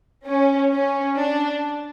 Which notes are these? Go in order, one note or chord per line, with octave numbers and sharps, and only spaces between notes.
C#4
C#4
D4